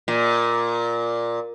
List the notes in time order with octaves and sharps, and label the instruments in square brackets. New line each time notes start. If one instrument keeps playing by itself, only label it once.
[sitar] A#2